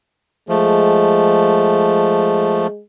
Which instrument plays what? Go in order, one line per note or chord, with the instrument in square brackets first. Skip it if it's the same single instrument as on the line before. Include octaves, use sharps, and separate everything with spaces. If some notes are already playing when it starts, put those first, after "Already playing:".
[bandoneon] F3 A3 [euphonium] G#3